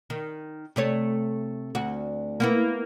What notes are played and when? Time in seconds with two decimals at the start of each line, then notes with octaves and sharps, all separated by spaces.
0.10 D#3
0.76 C3 A3 C#5
1.75 D2 F#4
2.40 A#3 B3 E4